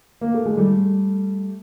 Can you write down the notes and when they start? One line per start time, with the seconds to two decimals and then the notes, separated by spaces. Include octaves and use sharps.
0.21 A#3
0.34 A3
0.45 G#3
0.57 G3 A3